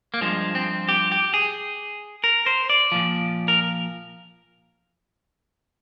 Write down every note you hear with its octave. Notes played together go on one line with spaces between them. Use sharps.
A#3
G2 F3 G#3
C4
G4
G4
G#4
A#4
C5
D5
A#2 F3
A#4